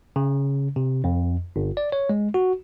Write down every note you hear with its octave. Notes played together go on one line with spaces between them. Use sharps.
C#3
C3
F2
G1
D5
C#5
G#3
F#4